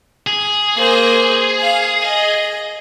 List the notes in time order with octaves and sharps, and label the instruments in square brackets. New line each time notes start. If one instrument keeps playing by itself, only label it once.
[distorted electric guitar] G#4
[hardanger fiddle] A#3 C5
F5
D#5